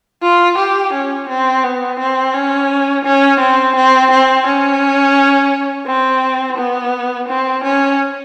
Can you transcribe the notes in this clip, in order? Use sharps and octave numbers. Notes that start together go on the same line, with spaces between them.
F4
G4
C#4
C4
B3
C4
C#4
C#4
C4
C4
C4
C#4
C4
B3
C4
C#4